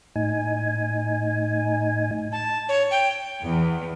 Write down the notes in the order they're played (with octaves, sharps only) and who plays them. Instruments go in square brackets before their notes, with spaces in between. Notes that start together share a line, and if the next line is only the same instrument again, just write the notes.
[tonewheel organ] A2 D#4 G#5
[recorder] A5
C#5
G5
[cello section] E2